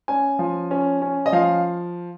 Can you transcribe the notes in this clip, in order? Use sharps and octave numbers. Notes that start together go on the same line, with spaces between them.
C#4 G#5
F3
C#4
C#4
D#5
F3 F5